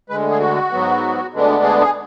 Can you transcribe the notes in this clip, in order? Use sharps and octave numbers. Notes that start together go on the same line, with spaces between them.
D2 D3 G#3 B4
G#4
F#4
G#2 F#3 B3
D2 D3 G#3 B3 D4
G#4
G#4